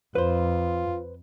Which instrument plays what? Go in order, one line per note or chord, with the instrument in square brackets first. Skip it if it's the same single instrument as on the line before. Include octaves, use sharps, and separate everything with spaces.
[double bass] F2 [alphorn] F4 [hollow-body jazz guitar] B4 C5